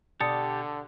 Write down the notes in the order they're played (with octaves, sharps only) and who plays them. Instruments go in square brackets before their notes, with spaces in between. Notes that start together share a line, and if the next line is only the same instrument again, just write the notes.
[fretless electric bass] B2 [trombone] D3 [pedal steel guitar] G4 A5 [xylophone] D5 D#6 C#7